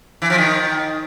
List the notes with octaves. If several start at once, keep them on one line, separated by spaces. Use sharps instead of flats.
E3
F3
D#3